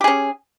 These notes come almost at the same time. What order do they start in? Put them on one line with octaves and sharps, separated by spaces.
G4 G#4 C#4